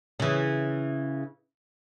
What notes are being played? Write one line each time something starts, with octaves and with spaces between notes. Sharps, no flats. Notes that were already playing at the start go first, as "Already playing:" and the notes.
C#3 E3